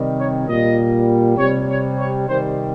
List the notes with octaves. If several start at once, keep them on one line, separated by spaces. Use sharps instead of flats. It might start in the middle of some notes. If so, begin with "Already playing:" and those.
Already playing: C3 D#3 G3
C#5
A#2 G3 D#5
C3 G3 C#5
C#5
C#5
C3 D#3 G3 C5